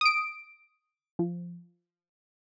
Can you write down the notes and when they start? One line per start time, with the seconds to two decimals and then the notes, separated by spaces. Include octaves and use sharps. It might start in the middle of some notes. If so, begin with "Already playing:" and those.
0.01 D#6 D7
1.19 F3